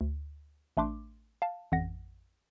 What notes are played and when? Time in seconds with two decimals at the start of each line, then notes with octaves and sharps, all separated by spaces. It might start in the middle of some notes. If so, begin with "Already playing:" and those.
0.01 D2
0.77 A1 A3 D4 C6 D6
1.42 F5 A5
1.72 A1 F2 F#5 A#6